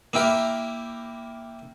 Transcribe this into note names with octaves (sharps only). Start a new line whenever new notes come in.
A#3 E4 G4 A#4